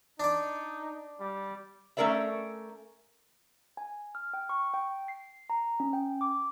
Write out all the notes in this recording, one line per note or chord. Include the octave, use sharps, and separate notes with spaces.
D4 D#4 D5
G3
A3 C#4 A4 A#4 D5 E5
G#5
F6
G5
C#6
G5
C7
A#5
C#4
G5
D6